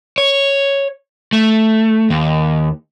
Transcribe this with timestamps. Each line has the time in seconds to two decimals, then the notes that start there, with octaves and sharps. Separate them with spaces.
0.18 C#5
1.33 A3
2.10 D#2